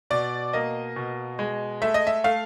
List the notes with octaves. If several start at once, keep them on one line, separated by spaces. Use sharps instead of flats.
B2 D5
A#3 D#5
B2
G#3
A3 E5
D#5
E5
A3 F5